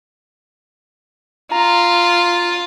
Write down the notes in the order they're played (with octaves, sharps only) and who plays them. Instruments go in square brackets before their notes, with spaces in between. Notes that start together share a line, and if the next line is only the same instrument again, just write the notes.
[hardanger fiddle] F4 [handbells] A#5